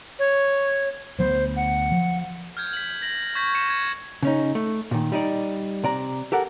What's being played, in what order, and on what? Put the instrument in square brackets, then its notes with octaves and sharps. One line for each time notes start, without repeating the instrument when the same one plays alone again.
[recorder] C#5
[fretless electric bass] D2 F#3 B3 [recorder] C5
[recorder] F#5
[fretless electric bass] F3
[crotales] F6 G6 G#6
B6 F#7
A#6 F#7
C#6 G6 G#6 B6
A#6 C#7 D#7 E7
G#6
[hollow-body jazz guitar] C#3 C#4 D#4
A3
A#2 D#3
G3 D#4 D5
C3 D5 A#5
G4 A4 A#4 F#5